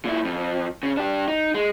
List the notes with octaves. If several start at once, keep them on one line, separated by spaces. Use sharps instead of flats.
A#2 E4
F2
C#3
D4 G4
D#4
G#3